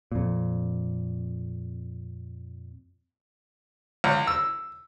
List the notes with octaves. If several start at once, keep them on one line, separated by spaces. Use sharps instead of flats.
F2 A#2
C#2
E6